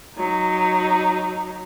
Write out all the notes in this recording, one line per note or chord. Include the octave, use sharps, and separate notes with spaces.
F#3 D#4